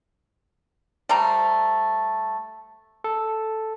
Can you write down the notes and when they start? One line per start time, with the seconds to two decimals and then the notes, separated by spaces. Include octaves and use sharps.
1.09 G3 A3 C5 A#5
3.04 A4